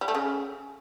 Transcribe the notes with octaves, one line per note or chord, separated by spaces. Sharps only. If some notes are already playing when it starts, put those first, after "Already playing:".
G3
A3
C#3